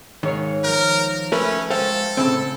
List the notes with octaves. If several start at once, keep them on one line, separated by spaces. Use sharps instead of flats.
G#2 D#3 C#5 F5
F3 A#4 G6
A3 C#4 A#4 B4 E5
G#3 A4 C5 F5 G5
A2 C#3 C4